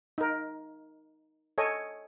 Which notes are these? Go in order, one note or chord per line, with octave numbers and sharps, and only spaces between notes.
D#4 A#4
A4 C#5 D#5 G#5